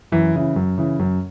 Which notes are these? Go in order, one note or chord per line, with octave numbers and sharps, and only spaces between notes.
F#2 E3
C#3 E3
F#2
C#3 E3
F#2